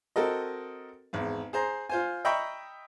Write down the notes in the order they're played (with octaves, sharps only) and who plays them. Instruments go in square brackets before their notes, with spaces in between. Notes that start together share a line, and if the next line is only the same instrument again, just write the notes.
[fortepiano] C4 F#4 A4 A#4 D#5
G#1 E2
G#4 C5 A#5
F4 C5 G#5
D#5 E5 G5 A#5 B5 C#6